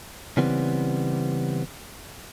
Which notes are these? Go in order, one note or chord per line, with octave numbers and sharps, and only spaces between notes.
C#3 E3 G3 B3 C4